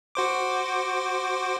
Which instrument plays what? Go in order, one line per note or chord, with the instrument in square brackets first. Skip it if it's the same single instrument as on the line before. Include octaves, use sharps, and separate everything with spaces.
[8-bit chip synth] F#4 C5 D6